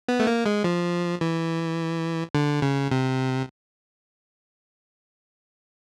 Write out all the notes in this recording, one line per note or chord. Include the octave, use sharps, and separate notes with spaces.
B3
A3
A#3
G#3
F3
E3
D3
C#3
C3